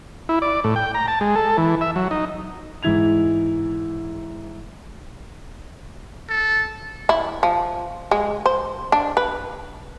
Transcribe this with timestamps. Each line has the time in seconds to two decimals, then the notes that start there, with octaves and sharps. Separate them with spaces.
0.29 E4
0.42 D5
0.64 A2
0.76 G5
0.94 A#5
1.08 A5
1.21 G#3
1.35 A4
1.58 E3
1.81 E5
1.96 F#3
2.11 D#4
2.83 G#2 E3 E4 G#6 F7
6.29 A4
7.09 E4
7.43 F3
8.11 G#3
8.46 C5
8.92 D4
9.17 B4